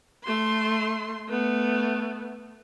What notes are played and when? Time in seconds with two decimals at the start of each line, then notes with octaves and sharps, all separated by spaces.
0.24 A3 C6
1.28 A3 B3